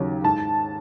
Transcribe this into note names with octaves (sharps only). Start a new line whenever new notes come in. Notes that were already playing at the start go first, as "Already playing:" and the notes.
Already playing: D#2 C#3 F#3
G#2 A5